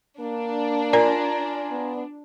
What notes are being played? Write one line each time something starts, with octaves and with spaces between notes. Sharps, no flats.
A#3 D4
F4 A#4 D5 G#5 A#5
B3